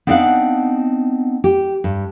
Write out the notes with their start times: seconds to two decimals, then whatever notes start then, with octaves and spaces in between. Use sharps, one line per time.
0.07 B3 C4 D4 D#4 F5 F#5
1.44 G4
1.84 G2